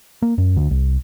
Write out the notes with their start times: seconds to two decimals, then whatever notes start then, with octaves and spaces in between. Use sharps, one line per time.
0.22 A#3
0.38 F#2
0.56 D2
0.71 C2